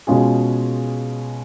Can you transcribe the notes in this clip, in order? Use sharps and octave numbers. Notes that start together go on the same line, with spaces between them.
B2 G#3 C#4 F4 G#4